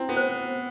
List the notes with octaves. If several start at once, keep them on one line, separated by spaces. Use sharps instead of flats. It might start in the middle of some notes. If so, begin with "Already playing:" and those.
Already playing: C4 E4
B3
C5